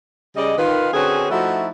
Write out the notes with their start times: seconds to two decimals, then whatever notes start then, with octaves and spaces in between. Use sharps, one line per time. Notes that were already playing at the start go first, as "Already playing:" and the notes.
0.36 C#3 G3 D5 D#5
0.57 D#3 F4 B4
0.93 D3 C4 C#4 F#4 G#4 B4
1.30 F3 A3 D#4 E4 F#4